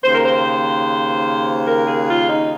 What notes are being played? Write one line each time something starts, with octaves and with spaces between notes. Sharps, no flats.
D#2 C#3 C5
A#4
C5
A#4
G#4
F4
D#4